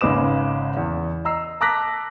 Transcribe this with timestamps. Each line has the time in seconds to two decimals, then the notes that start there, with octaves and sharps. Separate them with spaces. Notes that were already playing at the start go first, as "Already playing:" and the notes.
0.01 G#1 C#3 G#3 B4 D6 E7
0.77 E2
1.25 D#5 A#5 E6 C7
1.61 A5 A#5 D6 F#6 A#6 B6